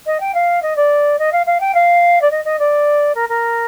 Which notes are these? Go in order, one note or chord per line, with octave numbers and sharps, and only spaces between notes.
D#5
G5
F5
D#5
D5
D#5
F5
F5
G5
F5
D5
D#5
D#5
D5
A#4
A#4